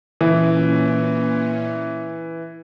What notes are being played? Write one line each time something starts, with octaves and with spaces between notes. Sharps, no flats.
A#2 E3 C#4